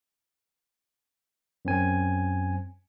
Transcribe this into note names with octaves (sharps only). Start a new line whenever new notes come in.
F#2 C4 G#5